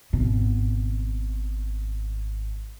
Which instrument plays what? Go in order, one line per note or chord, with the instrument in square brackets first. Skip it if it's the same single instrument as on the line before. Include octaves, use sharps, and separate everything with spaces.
[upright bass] G#1 B2